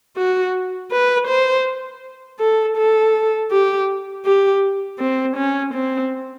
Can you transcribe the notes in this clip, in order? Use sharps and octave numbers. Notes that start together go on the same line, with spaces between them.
F#4
B4
C5
A4
A4
G4
G4
C4
C#4
C4